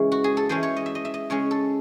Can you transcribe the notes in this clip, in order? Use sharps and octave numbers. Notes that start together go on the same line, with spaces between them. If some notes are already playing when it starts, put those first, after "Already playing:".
Already playing: C#3 E3 G#3
F#4
G#4
A4
E3 G#3 C#4 C5
C#5
D#5
E5
D#5
E5
D#5
C#3 G#3 C#4 C#5
A4